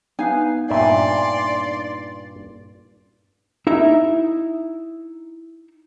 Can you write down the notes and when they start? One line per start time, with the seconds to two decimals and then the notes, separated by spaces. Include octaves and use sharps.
0.19 B3 D#4 B4 F5 G#5
0.70 G2 A#2 D5 E5 G#5 C6
3.67 D#4 E4 E5